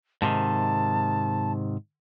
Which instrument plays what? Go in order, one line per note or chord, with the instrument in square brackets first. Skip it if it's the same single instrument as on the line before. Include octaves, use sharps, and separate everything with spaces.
[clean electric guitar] G#2 C3 D#3 [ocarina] A5